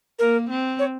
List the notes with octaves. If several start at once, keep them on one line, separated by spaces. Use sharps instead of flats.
A#3 A#4
C4
C#5